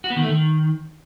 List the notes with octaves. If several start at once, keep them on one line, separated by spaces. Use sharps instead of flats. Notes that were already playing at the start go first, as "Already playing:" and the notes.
F#4
B3
D#3
A3
D#3